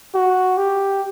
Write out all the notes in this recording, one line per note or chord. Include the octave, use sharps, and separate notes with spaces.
F#4
G4